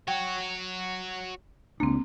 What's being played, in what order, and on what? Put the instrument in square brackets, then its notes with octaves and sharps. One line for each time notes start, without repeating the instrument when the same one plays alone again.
[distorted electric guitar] F#4 C#5 [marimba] G5
[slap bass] C#2 D4 [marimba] A#3 C4